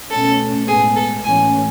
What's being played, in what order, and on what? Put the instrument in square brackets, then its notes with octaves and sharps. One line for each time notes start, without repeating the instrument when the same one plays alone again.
[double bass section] B2 A3 C#4 [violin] A4
[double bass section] A2 G#3 B3 [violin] G#4
[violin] A4
[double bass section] A2 E3 A3 C#4 [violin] G#5